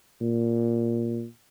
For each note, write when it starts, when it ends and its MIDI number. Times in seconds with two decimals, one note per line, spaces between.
0.21 1.26 46